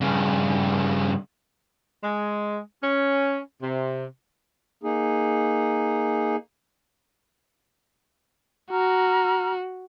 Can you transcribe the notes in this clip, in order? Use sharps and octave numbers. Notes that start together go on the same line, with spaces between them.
G2 C#3
G#3
C#4
C3
A#3 D#4 G#4
F#4 A#5 F6